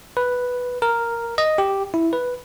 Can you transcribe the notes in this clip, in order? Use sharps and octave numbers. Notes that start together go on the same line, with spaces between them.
B4
A#4
D#5
G4
E4
B4